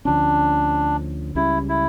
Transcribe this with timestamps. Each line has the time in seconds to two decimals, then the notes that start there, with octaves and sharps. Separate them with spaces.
0.05 D2 D3 F3 C#4 D4
1.35 C#2 C#3 G3 C#4 E4
1.69 E4